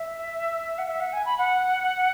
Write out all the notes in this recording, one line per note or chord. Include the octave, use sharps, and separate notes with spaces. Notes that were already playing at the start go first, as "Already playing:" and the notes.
Already playing: E5
F#5
E5
F#5
G#5
B5
F#5